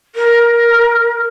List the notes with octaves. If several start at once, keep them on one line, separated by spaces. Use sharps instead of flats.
A#4